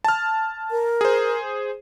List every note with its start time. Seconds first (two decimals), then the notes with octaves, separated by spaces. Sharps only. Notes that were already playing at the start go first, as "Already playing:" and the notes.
0.04 A5 F6
0.71 A#4
1.01 G#4 C5